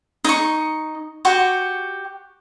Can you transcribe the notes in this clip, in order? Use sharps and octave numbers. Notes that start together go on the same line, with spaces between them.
D#4 C#6
F#4 G4 C#6